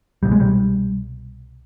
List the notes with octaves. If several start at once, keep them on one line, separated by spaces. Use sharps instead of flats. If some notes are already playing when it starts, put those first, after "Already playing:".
C2 B2 G3
G#3
G3